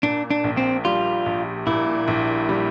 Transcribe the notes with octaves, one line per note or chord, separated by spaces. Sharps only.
A#2 D4
D4
A#1
C4
G3 F4
A#1
A#2 E4
A#1
G3